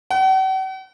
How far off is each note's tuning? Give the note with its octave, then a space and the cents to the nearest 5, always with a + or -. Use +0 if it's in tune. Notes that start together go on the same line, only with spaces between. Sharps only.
F#5 +45